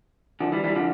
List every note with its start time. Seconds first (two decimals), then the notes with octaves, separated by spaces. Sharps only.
0.40 D3 F3
0.52 E3 G3
0.64 E3 G3
0.75 D3 F3